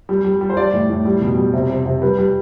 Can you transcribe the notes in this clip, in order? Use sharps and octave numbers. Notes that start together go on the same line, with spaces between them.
G3
G3
G3
C5
G3 D5
A2
A2
G3
B2
G3
C3
C3
C3
G3 B4
G3